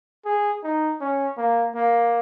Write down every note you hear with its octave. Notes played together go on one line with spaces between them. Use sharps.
G#4
D#4
C#4
A#3
A#3